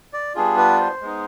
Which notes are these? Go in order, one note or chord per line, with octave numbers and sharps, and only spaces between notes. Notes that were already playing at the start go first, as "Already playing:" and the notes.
D5
G3 B3 D4 F4 G#4
B4
C5
G#3 B3 D#4